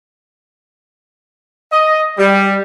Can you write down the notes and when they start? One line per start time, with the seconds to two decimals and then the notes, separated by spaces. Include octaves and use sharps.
1.72 D#5
2.18 G3